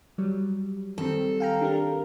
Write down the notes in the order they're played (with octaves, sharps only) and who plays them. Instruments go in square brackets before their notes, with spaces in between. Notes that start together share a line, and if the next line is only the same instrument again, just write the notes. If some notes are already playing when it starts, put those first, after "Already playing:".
[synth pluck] F#3 G3
[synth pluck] D#3 G3 C4 [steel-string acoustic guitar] A4
[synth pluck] F5 G5 A#5
D4 G4 A#4